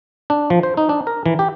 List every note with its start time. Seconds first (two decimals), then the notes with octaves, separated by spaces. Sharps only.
0.30 D4
0.50 F3
0.63 C5
0.77 D#4
0.89 D4
1.07 A#4
1.26 E3
1.39 G4